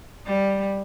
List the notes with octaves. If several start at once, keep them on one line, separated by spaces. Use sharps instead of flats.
G3